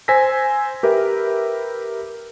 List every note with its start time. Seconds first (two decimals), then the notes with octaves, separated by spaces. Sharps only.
0.08 C5 G#5 E6 A#6 B6
0.83 G4 A#4 B4 E5